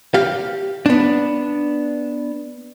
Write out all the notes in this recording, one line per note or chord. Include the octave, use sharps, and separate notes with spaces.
G4 F5
B3 D4